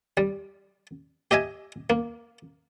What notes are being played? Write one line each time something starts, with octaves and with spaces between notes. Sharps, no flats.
G3
G4 D#5 E5 G#5
A#3